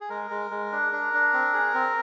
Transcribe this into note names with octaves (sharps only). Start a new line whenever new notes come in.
G#4
G#3 A#4
G#3
G#3
D4
D4
D4
C4
G#4
C4